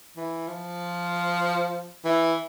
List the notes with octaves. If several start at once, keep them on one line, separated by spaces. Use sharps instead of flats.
E3
F3
E3